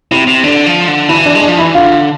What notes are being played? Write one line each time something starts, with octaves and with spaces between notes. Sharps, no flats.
C3 E4
C3
D3 D4
F3
D3
E3 E4
D4
G#3
D4
F3
E3 E4
D3 F4